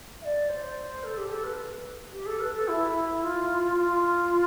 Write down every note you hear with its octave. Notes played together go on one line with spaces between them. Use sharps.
E5
D5
C5
A4
G4
A4
B4
G4
A4
B4
A4
E4
F4
F4